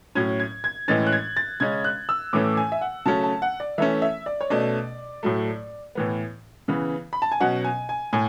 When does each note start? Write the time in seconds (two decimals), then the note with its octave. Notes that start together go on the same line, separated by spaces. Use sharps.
0.15 A2 F#3 C#4 G#6
0.40 G#6
0.64 G#6
0.88 A2 E3 G#3 C#4 A6
1.07 F#6
1.13 G#6
1.37 A6
1.60 C#3 G#3 C#4 G#6
1.84 F#6
2.09 E6
2.33 A2 E3 A3 C#4 D6
2.57 G#5
2.72 E5
2.81 F#5
3.06 C#3 F#3 A3 C#4 A5
3.23 A5
3.42 F#5
3.60 D5
3.78 E3 A3 C#4 E5
4.02 E5
4.26 D5
4.41 C#5
4.50 B2 A3 C#4 D5
5.23 A2 F#3 A3
5.95 A2 E3 B3
6.68 C#3 E3 B3
7.13 B5
7.22 A5
7.32 G#5
7.40 B2 F#3 C#4 F#5
7.64 G#5
7.89 G#5
8.13 A2 G#5